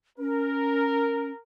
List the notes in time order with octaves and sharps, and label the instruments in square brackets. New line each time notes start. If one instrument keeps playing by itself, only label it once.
[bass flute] C#4 [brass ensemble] A#4